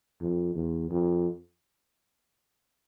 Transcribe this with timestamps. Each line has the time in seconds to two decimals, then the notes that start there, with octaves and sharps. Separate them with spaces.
0.21 F2
0.55 E2
0.91 F2